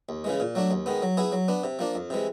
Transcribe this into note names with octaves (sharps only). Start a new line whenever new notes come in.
D#2
C#3 E3 G#3
A#2
F#3 A3 D4
D#2
D#3 G#3 B3
F#3
B3 E4 G#4
F#3
B3 D4
C3
F3 A#3 D4
F2
C3 E3 G#3